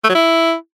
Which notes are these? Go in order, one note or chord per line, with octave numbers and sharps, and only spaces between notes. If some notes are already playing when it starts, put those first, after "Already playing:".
A3
F#3
E4